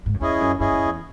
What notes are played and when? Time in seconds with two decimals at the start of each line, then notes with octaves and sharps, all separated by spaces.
0.06 G#2
0.14 F#2
0.20 E2 C#4 E4 G#4 D#5
0.41 F#2
0.59 F#2 C#4 E4 G#4 D#5
0.72 F#2
0.85 E2